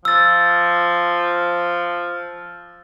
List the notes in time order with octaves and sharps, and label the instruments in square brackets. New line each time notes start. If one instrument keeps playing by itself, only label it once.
[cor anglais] F3 [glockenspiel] E6 A6